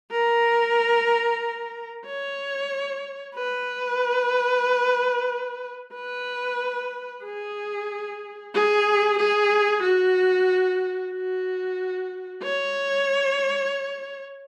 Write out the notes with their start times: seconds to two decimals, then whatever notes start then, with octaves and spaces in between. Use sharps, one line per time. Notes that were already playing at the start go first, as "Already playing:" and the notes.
0.12 A#4
2.06 C#5
3.35 B4
5.95 B4
7.25 G#4
8.54 G#4
9.19 G#4
9.84 F#4
11.13 F#4
12.43 C#5